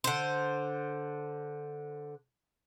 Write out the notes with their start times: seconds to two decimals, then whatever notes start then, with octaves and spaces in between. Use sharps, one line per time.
0.04 D3 C5